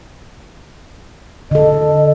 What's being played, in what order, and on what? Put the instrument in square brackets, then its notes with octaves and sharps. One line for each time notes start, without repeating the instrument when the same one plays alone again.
[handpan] D3 A4 [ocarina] D#5